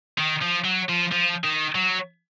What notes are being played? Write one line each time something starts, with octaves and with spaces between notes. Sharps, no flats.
D#3
F3
F#3
F3
F3
D#3
F#3